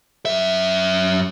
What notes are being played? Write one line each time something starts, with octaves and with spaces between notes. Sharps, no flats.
F#2 E5